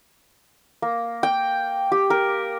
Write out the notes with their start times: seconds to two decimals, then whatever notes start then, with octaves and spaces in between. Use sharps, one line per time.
0.82 A#3
1.23 G5
1.92 G4
2.10 A#4